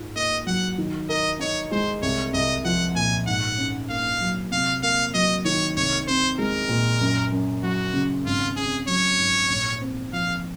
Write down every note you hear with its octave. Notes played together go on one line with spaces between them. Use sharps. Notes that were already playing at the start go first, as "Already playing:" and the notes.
Already playing: G#2 F4
A#3 D#5
F#3 F#5
D#3
A#4 D#5
D#4 C#5
G#3 C5
C2 C#5
C2 D#5
F3 F#5
A#2 G#5
G#2 F#5
C#4
A#3 F5
F#3
C3 F5
A#3 F5
F#3 D#5
D#3 C#5
C2 C#5
C4 C5
G#3 A#4
A#2
F#2
F#2
F#3 F#4
C#3
G#1 F4
C4 G#4
F#3 C#5
G#2
A#1
C4
F3 F5